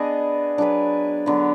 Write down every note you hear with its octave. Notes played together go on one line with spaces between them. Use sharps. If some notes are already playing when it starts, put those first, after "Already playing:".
Already playing: B3 D4 G#4 D#5
F#3 D4 G#4 B4
D3 F#3 B3